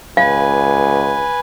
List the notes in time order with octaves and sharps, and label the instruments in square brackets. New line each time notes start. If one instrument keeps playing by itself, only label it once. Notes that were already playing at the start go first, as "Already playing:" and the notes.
[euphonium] C#2 [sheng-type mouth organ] B4 G#5 [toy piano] F5